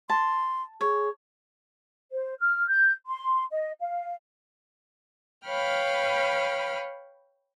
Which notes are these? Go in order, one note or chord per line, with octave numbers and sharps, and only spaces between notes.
A5 C6
G#4 C#5
C5
F6
G6
C6
D#5
F5
B4 C#5 F5 G5 B5 F6